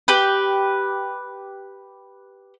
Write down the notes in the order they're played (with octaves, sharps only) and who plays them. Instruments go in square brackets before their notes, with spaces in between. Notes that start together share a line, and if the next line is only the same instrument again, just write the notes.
[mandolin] G4 B4